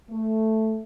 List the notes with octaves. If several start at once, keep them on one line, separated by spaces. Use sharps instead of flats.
A3